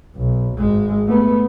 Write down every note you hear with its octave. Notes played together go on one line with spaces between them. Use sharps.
B1
G#1 G#3
A3 B3